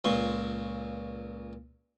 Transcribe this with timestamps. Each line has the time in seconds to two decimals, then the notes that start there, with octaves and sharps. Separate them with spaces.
0.04 C#2 A#2 C6 C#6